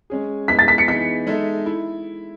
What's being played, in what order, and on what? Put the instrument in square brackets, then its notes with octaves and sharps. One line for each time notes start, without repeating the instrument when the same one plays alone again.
[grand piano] G#3 C#4 G#4
[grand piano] G#3 B3 E4 G#4 [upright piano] B6
[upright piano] A6
B6
C#7
[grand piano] E3 B3 D#4 G#4 [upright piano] B6
[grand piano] G#3 D#4 A4 E5
E4